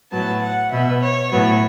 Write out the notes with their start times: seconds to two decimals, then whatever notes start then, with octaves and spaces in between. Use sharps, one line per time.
0.12 A2 F#3 B3 A5
0.42 F#5
0.71 B2 B3 E5
1.02 C#5
1.31 A2 F#3 B3 C#5